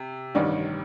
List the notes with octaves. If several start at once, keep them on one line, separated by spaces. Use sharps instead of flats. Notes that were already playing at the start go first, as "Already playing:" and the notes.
Already playing: C3
A1 G2 D#3 D5